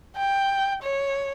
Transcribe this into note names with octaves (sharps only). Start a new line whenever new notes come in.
G5
C#5